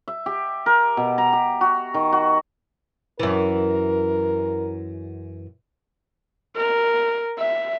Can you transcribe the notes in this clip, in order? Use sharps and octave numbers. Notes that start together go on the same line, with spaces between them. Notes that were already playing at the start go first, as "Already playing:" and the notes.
E5
G4
A#4
B2
A#5
G4
F#4
D#3
F#4
F#2 E3 A#4
A#4
E5